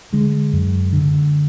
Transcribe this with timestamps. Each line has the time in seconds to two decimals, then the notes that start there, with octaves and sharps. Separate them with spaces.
0.13 D3 G#3
0.53 F#2
0.93 D3